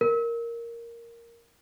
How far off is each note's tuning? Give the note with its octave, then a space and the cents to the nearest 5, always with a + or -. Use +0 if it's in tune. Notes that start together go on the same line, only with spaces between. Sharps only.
A#4 +0